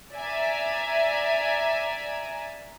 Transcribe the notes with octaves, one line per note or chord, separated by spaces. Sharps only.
D5 E5 G#5 A#5